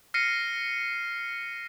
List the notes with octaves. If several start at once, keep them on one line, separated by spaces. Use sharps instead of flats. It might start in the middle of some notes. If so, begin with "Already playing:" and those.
F6 A#6 C7 C#7 D#7